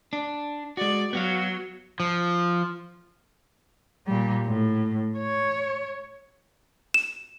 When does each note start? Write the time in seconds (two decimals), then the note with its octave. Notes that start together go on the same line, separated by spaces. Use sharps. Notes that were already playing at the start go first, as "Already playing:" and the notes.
0.13 D4
0.77 G#3 F#4 D5
1.13 F#3 B3 F#4 F5
2.00 F3
4.07 A#2 G3
4.47 A2
5.19 C#5
6.94 E7